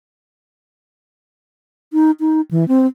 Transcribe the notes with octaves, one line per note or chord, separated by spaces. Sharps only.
D#4
D#4
E3
C4